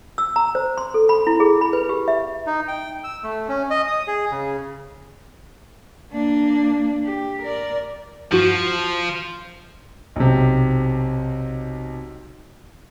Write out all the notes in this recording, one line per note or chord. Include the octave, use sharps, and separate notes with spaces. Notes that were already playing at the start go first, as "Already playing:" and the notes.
E6
A#5
C5
C6
A4
B5
E4
G#4
B5
B4
G4
E5
D#4
G5
E6
A3
C#4
D#5
D#6
G#4
C#3
A#3 D4
G4
A#4 D5
E2 G2 F3 F#4
B1 C3